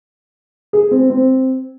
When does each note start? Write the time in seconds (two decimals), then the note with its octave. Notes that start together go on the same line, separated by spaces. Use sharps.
0.73 G#4
0.91 C4
1.10 C4